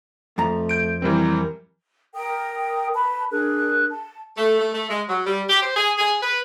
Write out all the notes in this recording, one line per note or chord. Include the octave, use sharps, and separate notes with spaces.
F2 F3 A3 A#5
G6 D7
E3 G3 C4 A#4
A#4 G5 D#6
B4 A5 B5
D4 G#4 A#4 F#6
A5
A3
A3
A3
G#3
F#3
G3
G4
C5
G#4
G#4
B4